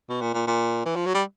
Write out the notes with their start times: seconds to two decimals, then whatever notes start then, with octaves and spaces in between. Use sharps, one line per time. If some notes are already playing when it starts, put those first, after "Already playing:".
0.10 B2
0.22 A#2
0.34 A#2
0.47 A#2
0.86 E3
0.96 F3
1.06 F#3
1.14 G3